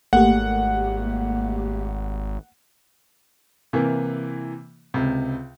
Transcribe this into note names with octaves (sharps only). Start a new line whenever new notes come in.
G#1 A3 A#3 G4 F#5
C3 E3 A#3
C#2 C3